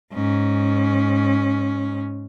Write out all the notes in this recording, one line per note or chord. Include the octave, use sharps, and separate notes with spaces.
G#2 C#4